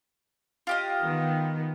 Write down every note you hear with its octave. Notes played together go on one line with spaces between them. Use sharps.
F4 G4 D#5
D#3 B3